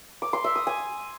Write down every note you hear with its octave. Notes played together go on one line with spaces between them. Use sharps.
D6
C6
E5
D#6
G#5